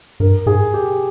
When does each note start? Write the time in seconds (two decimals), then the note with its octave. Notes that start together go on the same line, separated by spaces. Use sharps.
0.20 G2 A#4
0.46 G#2 G#4
0.74 G4